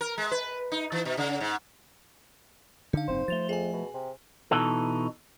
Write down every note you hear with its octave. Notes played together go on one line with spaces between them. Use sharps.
A#4
G#3
B4
D#4
E3
B2
C#3
G#2
D3 D#4 F5
F#1 G#2 C4 C5
F3 A3 A6 F7 G7
F2 G#4 G#5
B2
C3
B2 E3 D#4 A4